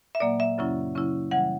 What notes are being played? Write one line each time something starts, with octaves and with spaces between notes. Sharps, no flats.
E5
A#2 F#3 A#3 D5
E5
F#2 C#3 F#3 C#4 E4
C#3 F#3 C#4 E4
C#3 E3 G3 F#5